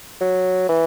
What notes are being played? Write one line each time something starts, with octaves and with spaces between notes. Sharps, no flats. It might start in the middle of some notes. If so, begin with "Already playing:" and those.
F#3
E3